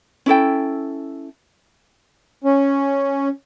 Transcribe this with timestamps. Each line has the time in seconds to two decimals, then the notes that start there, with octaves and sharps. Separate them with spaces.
0.26 C#4 E4 A4 G5
2.44 C#4